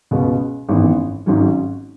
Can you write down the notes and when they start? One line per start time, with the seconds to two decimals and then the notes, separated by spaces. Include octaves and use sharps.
0.11 C#2 B2 B3
0.69 G#1 F#2 E3 B3
1.26 G#1 G#2 F#3 C#4